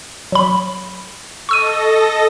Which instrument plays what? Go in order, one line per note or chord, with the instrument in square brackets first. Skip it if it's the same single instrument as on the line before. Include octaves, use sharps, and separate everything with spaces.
[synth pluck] F#3 B5
[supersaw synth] A4 D#5 A#6 [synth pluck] C#6 E6 D#7